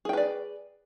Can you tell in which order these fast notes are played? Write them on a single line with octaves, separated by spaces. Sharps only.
G#4 G5 B4 D5